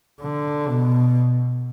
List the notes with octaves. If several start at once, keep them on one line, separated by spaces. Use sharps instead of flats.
D3
B2